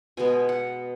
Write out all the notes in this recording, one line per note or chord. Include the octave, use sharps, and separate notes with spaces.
B2 G#3 B3 G#5
F#5